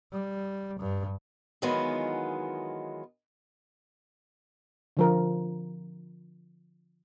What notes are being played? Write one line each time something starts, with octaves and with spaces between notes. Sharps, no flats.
G3
G2
D#3 E3 F#3 G#3 B3 F4
D3 F3 A#4